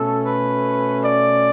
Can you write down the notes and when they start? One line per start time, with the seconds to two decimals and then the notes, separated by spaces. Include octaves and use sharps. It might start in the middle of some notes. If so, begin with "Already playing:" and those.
Already playing: B2 A3 C#4 A4
0.25 B4
1.04 D5